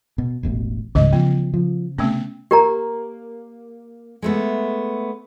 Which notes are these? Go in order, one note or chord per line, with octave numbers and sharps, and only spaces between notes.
B2
E1 A1 B2
C#2 G#2 C#3 E3 G3 D#5
F3 B3
F3
C3 A3 B3 C#4
A#3 G4 A#4 A#5
G#3 A3 B3